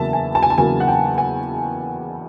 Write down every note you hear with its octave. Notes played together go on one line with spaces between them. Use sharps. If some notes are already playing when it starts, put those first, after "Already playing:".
Already playing: E2 C#3 F#3 A#3 E5 A5
G#5
A5
G#5
A5
E2 C#3 F#3 A#3 G#5
F#5
G5
G#5